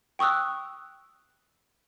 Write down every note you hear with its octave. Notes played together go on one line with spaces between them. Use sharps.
G5 C#6 D#6 E6 F#6